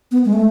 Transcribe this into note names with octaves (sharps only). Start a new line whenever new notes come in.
B3
G#3
A3